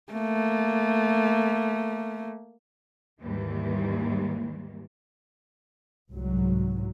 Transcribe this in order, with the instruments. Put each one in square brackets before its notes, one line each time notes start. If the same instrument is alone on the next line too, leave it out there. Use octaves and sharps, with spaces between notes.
[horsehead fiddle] A3 A#3
[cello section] D#2 G#2 D#3 E3 G3 A#3
[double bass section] C2 G#2 F#3